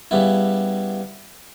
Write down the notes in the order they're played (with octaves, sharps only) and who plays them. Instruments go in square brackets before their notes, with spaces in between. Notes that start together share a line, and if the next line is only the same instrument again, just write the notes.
[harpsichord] C#3 G3 B3 E4